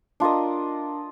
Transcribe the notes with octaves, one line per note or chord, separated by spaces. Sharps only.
D4 F4 A#4 D#5